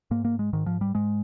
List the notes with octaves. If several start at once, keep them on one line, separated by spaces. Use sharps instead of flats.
G#2 A#3
A#3
G#3
G#2 D#3
F3
G3
G#2 G#3